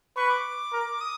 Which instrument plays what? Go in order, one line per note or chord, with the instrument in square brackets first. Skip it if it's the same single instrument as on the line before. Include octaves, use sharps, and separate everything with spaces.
[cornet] B4 [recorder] C#6
[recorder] D6
[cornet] A#4
[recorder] D#6